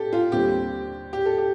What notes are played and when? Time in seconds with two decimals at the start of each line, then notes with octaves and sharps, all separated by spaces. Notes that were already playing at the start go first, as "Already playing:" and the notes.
Already playing: G4 A4
0.13 F4
0.32 D#2 D3 G3 C4 G4
1.13 G4
1.26 A4
1.38 G4